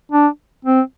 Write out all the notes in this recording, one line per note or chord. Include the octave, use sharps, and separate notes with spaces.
D4
C4